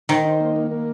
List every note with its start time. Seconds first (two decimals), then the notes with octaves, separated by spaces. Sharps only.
0.09 D#3 C5
0.25 D#4
0.41 A#3
0.56 A#3
0.71 A#3